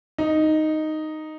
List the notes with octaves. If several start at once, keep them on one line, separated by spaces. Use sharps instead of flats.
D#4